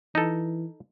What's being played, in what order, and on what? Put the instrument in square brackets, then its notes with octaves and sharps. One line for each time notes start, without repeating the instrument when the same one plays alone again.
[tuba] E3 [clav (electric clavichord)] D#4 A4